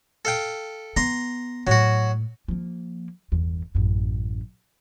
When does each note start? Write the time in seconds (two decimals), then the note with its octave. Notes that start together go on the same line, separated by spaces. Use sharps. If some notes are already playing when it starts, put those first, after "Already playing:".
0.25 A4 F5 G5
0.96 B3 A#5 C6
1.67 A2 F#3 F#4
2.48 F3 A#3
3.32 G1 E2
3.75 A1 F#2